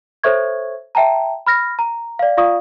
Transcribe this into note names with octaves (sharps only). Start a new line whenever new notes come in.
A4 C5 C#5 E5 C#6 G#6
E5 G5 A5 A#5
B5 F6 A#6
A#5
D5 F5
F4 D5 F5 C#6 D#6